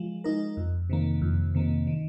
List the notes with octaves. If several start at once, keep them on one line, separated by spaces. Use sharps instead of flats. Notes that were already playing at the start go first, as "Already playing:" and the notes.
Already playing: F3 G#3
G#3 D#4 A#4
F2
C3 D#3 A#3
F2
C3 D#3 A#3
D#3